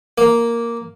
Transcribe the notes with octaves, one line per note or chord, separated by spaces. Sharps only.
A#3